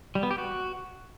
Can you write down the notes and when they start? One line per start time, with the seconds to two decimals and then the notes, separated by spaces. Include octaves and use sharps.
0.15 G3
0.23 B3
0.31 G4
0.38 F#4